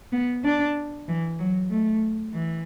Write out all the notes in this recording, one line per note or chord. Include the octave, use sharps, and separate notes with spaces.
B3
D4
E3
F#3
A3
E3